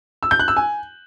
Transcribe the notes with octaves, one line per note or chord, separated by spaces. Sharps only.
E6
G6
F#6
E6
G#5